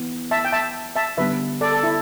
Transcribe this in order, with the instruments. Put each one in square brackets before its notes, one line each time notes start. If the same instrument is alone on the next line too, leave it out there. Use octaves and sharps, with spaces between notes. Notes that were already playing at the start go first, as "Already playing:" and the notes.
Already playing: [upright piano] E3 B3
[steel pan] E5 A5
G5
E5 A5
E5 A5
[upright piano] D3 G3 B3 [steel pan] B4 E5
[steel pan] A4 D5
A4
E4